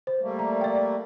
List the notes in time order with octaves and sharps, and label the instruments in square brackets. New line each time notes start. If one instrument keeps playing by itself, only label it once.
[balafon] C5
[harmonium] G3 A3 A#3
[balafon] A#5
D5 G5